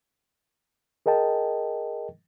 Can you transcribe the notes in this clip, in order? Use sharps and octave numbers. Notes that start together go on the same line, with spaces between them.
G#4 A#4 D#5 G5 A5